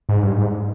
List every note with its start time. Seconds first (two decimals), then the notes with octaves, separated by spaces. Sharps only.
0.09 G#2
0.23 G2
0.38 G#2